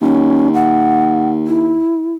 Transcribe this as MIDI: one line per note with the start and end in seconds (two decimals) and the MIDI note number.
0.02 1.78 39
0.02 0.49 61
0.54 1.30 78
1.47 2.14 64